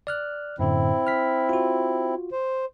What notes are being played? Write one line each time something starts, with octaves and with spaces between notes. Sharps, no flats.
D5 F6 F#6
F#2 A2 D3 C4 E4
F6 B6
F4 F#4
C5